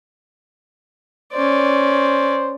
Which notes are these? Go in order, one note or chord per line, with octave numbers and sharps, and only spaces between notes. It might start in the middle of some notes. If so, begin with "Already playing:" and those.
C#4 C5 D5